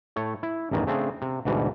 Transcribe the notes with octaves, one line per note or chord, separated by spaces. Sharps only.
A2 A3 C#5
E4
A1 E2 G2 D#3 E3
C#3 A3 C4 D4 G#4
C3
D2 G#2 B2 E3 G3